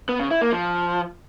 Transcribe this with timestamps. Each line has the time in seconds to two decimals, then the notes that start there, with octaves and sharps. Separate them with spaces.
0.09 B3
0.20 C#3
0.31 E4
0.41 A#3
0.52 F3